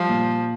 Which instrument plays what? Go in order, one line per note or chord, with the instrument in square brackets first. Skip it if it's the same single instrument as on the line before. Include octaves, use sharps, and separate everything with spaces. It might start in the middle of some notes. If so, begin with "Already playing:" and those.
Already playing: [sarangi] F3 [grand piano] G3
[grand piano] A#2